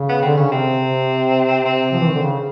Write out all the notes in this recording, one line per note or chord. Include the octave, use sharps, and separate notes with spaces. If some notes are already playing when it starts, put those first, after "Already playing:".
Already playing: C#3
B3
D3 C4
C#3 C#4
C3 C4
C4
F3
E3
D#3
D3
C#3